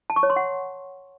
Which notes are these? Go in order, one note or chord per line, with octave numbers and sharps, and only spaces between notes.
A5
C#6
C#5
C6
F#5